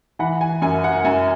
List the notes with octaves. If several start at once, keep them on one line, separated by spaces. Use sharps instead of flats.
E3 F#5 B5
G#5
F#2 G#5
F#5
F#2 G#5